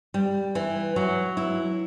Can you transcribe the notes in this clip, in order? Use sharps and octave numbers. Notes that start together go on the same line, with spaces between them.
G3
E3
F#3
E4